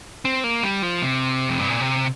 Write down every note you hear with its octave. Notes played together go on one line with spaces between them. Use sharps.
C4
A#3
G3
F3
C3
F2
G2
A#2
C3